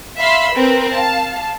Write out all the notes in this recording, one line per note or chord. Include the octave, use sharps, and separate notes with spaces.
E5 F5 B5 C6 E6
C4 A#4 B4
F5 A5